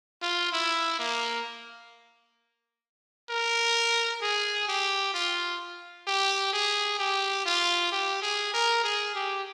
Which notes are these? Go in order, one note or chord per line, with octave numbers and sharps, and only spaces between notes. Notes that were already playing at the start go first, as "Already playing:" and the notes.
F4
E4
A#3
A#4
G#4
G4
F4
G4
G#4
G4
F4
G4
G#4
A#4
G#4
G4